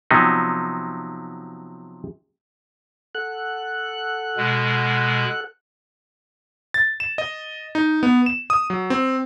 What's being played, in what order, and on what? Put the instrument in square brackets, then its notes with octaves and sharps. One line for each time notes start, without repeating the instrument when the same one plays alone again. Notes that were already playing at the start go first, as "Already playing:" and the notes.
[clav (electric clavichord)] C3 F3 F#3 B3 D#4
[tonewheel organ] A4 F#5 F#6
[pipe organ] B2 G#3
[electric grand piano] A6
E7
D#5
D#4
B3
E7
D#6
F#3
C4